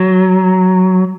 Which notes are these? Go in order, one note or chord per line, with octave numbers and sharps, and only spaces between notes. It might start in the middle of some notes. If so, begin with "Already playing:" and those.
Already playing: F#3